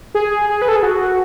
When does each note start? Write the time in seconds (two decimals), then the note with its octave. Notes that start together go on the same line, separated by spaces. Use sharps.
0.15 G#4
0.49 G#4
0.62 B4
0.68 A4
0.76 G#4
0.83 F#4